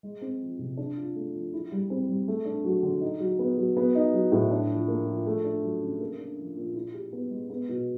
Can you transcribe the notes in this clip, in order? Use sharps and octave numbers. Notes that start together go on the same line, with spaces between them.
G#3
C4
F3
C3
D4
F4
A3
F3
E4
G3
C4
G3
A3
D4
F#3
D3
D#4
F#3
B3
F#3
B3
D#4
F#3
A2
D4
F3
A#3
F3
A3
D4
F#3
C#3
A#3
D4
F3
A#2
E4
G4
B3
G#3
B3
B2